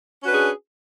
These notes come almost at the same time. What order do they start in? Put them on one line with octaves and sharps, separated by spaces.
C#4 F#4 B4 D4 G#4